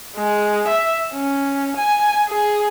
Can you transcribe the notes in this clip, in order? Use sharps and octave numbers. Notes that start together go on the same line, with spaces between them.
G#3
E5
C#4
G#5
G#4